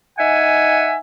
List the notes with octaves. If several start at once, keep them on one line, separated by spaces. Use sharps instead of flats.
D#4 E5 F#5 G#5